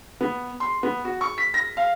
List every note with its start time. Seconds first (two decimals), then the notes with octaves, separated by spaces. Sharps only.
0.21 B3
0.60 C6
0.83 B3
1.05 F#4
1.21 C#6
1.38 B6
1.54 A#6
1.77 F5